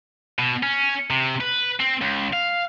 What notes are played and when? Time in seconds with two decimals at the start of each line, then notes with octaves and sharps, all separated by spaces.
0.39 B2
0.63 C#4
1.10 C3
1.41 B4
1.80 C4
2.02 C#2
2.33 F5